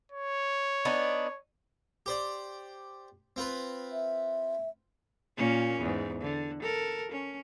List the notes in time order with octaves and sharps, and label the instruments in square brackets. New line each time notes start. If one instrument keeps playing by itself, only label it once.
[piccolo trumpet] C#5
[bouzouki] B3 D4 D#4
[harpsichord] G4 C5 D5
C4 F4 B4
[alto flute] E5
[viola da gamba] A#2 A#3 C#4
E2 G#2
D3
A4 A#4
C#4